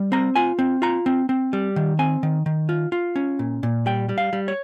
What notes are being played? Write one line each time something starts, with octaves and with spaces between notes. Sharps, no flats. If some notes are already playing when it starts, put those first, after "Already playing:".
Already playing: G3
C4 A#5
F4 G#5
C4
F4 A#5
C4
C4
G3
D#3
C4 G#5
D#3
D#3
F4
F4
C#4
A#2
A#2
G3 G5
G3
F5
G3
C#5